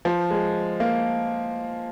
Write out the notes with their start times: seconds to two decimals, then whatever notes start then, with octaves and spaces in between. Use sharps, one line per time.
0.05 F3
0.31 G#3
0.80 A#3